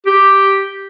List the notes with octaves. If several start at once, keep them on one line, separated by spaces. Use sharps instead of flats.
G4